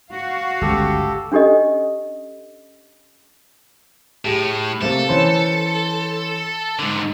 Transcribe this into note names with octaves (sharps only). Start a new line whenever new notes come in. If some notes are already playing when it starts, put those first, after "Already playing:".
F#4 F5
G1 C#2 G4 A4
C#4 D4 G4 A4 D#5
A2 G4 G#4
C3 A3 A#3 A4
E3 C#4 C5
G#2 D3